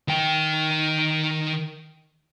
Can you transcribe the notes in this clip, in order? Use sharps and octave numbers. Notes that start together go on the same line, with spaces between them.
D#3 G5